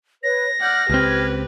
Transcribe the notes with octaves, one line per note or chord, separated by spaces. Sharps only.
B4 C#5 A#6
D5 F#5 F6 G6
C#2 C4 G4 B4 F6 G#6